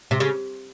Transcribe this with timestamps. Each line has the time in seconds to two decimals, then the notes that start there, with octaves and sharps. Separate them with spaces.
0.11 C3
0.20 C#3